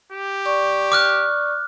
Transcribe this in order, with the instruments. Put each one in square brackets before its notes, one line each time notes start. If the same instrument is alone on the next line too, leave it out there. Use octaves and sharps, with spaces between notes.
[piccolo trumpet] G4
[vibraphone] D5 C#6
[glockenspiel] D6 F6 F#6